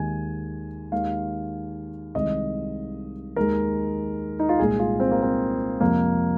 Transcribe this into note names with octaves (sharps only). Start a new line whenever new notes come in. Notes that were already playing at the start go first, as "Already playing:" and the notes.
Already playing: D#2 D#3 G#3 G#5
D#2 D#3 G#3 F5
C2 C3 D#3 G#3 D#5
D#2 D#3 G#3 A#4
D#4
F4
C2 A#2 G#3 G#4
F4
C4
A#3
C4
F2 C3 F3 G#3 A#3